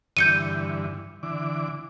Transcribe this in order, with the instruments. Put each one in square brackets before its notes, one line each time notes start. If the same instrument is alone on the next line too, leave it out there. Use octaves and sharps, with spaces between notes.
[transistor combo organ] G2 D3 E3 [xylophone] G6 C#7 D#7
[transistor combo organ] D3 E3 D6